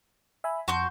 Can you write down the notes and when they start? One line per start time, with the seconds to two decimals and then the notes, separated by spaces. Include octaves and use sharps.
0.44 E5 G#5 B5
0.68 F2 F#4 C6 G6